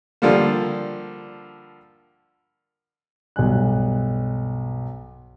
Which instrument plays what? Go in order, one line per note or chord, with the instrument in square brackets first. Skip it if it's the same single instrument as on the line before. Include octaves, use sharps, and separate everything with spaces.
[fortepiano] D3 F3 G3 A#3
[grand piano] B1 G2 G#5 F#6